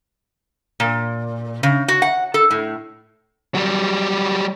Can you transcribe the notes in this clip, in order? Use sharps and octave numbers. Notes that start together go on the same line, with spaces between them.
A#2
C#3
F#4
F#5
A4
A2
F#3 G3